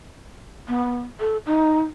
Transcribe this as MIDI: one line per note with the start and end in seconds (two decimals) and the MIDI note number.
0.68 1.02 59
1.20 1.37 69
1.46 1.84 63